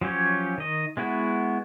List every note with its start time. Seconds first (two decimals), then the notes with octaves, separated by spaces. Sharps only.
0.01 F3 F#3 C#4 G4 C#5
0.58 D#3 D#5
0.97 G#3 B3 E4 F#4